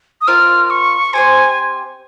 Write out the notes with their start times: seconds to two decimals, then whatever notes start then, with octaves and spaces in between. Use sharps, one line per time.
0.21 D#6
0.27 C4 F4 A#4 D#5 F6
0.70 C#6
1.13 C4 G4 C5 G#5